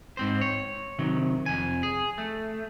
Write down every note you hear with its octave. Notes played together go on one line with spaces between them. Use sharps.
G#2 C4 C5
C#5
C3 D#3 F#3
F2 G#5
G#4
A3